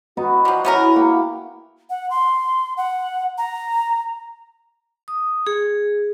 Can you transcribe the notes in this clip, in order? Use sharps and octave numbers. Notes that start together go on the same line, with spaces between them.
B3 D#4 F#4 D#5
F3 G3
B3 C#4 E4 A#4
A#3 G5 C#6
F#5
C6
F#5
A#5
D#6
G#4